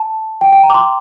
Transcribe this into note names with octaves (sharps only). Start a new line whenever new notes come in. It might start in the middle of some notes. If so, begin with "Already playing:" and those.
Already playing: A5
G5
G5
A#5
D6
C6